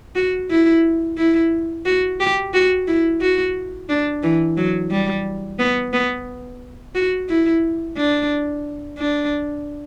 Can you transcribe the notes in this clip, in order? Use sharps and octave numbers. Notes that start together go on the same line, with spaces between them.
F#4
E4
E4
F#4
G4
F#4
E4
F#4
D4
E3
F#3
G3
B3
B3
F#4
E4
D4
D4